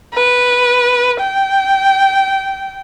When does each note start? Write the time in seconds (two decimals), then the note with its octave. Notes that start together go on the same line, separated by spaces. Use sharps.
0.13 B4
1.19 G5